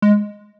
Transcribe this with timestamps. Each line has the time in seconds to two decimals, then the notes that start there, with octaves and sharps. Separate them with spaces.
0.02 G#3